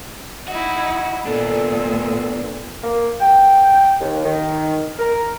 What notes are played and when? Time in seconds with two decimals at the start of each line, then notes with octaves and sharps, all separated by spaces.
0.48 D#4 E4 F#4
1.26 A#2 B3 D4 A4
2.84 A#3
3.21 G5
4.01 D#2
4.24 D#3
4.99 A#4